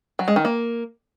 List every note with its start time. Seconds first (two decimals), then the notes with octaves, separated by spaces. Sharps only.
0.19 F#3
0.28 G#3
0.36 D#3
0.45 A#3